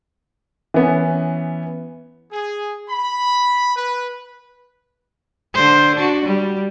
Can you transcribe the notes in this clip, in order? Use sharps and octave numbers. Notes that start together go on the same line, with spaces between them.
E3 B3 C#4
G#4
B5
B4
D3 C5
D4 F#4
G3